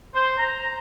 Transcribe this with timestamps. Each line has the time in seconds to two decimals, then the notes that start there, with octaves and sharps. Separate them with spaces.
0.15 C5
0.38 A#5